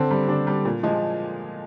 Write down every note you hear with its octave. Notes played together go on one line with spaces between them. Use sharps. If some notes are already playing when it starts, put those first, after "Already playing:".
Already playing: D3 C4
G3
D3 D4
G3
A#2
F3 G#3